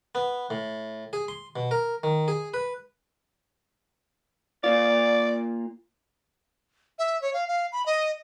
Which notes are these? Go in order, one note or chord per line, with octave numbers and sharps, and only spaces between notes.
B3
A2
G#4
C6
B2
A#4
D#3
G#4
B4
A#3 F4 D5
E5
C#5
F5
F5
B5
D#5